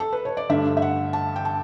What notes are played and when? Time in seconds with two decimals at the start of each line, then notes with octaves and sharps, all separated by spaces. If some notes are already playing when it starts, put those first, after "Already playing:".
0.00 A4
0.13 B4
0.25 C#5
0.37 D5
0.49 G2 D3 A3 E5
0.77 E5
0.82 F#5
1.13 A5
1.36 G5
1.45 A5